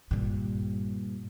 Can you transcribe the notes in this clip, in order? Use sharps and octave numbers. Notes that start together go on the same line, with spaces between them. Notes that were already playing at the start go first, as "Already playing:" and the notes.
G2 A#2